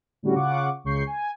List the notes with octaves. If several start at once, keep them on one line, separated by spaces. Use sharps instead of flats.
A2 D3 G3 C#4 F#4
C#3 F4 F#5 C#6 D6
C#2 C#3 C#6 G6 C7
G#5